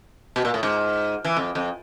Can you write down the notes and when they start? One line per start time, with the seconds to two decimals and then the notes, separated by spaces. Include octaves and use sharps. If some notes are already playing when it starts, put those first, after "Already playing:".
0.36 B2
0.45 A#2
0.54 A2
0.63 G#2
1.25 E3
1.37 F2
1.55 F2